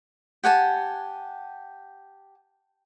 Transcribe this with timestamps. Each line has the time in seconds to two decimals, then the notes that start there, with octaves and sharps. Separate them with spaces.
0.44 G4 F#5 G#5 A5